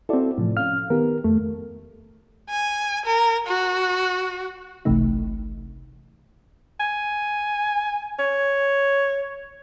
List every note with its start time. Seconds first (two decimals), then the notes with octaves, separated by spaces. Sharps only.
0.09 C4 E4 F#4 A4 D5
0.38 A2 C3 E3 F3
0.57 C#4 F5 F6
0.90 D#3 B3 G4 A#4
1.24 F2 A3
2.49 G#5
3.06 A#4
3.47 F#4
4.85 G1 C2 C3 E3 A3 D#4
6.80 G#5
8.19 C#5